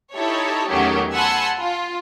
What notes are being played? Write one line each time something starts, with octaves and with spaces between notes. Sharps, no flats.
D#4 E4 G4 A4 C#5
E2 D#3 F#3 A3 C#4 G4
F#5 G#5 A5 B5 C6 E6
F4